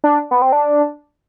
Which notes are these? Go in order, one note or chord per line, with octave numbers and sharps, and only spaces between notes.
D4
B3
C4
D4